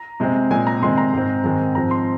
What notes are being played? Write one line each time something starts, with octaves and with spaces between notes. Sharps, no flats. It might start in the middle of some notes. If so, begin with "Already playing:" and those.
Already playing: A#5
C3 G#3 C4
A#2 G#3 C4 G#5
A#5
C3 D#3 G#3 C4 C6
A#5
G#2 G#3 C4
G#2 D#3 G#3 C4
G#2 F3 C4 A#5
C6